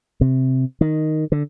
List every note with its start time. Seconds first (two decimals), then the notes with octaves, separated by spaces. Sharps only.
0.21 C3
0.81 D#3
1.32 D3